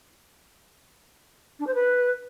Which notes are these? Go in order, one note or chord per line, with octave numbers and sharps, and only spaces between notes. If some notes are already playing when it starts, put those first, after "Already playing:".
D4
C5
B4